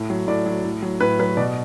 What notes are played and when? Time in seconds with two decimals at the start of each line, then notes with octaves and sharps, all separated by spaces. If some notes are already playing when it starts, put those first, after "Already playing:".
Already playing: A2
0.10 F#3
0.28 A2 D5
0.46 F#3
0.65 A2
0.82 F#3
1.01 A2 B4
1.19 F#3 B4
1.37 B2 D5